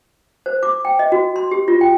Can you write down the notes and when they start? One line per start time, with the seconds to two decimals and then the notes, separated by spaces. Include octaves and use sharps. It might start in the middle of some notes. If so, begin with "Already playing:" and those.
0.46 C5
0.63 D6
0.85 G5
0.99 D#5
1.12 F#4
1.36 C6
1.51 G4
1.68 F4
1.81 G5